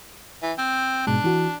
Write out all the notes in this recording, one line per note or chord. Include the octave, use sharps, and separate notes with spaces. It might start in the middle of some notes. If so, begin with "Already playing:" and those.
E3
C4
G#2 B2 G#3 D4
E3 F#4